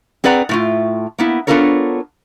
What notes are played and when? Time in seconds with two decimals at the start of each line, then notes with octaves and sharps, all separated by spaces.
0.24 C4 G#4 B4 D5 F#5 A#5
0.49 A2 A3 F4
1.18 A#3 B3 E4
1.47 B3 D4 F4 A4 A#4 C#5